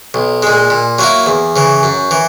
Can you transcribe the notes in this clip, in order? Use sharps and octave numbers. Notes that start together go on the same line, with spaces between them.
B1
A#2 G#3
A#2
F#3 A#3 E4
E2
C#3 E3
F#2
E3